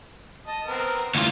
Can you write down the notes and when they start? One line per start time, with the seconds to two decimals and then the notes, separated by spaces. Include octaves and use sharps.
0.47 D#5 A5
0.66 B3 C4 A#4
1.15 D2 E3 F4